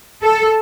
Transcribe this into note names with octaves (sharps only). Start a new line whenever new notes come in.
A4